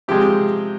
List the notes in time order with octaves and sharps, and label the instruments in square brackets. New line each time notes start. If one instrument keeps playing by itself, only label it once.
[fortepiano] C3 F3 G#3 G4